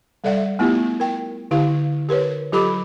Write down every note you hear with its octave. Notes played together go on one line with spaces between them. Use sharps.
G3 A4 D5 E5 F#5
A3 B3 E4 F4 G4
A#4 G5
D3 E4 G4 F5
G4 A#4 B4 C#5
F#3 F4 G4 A4 B5 D6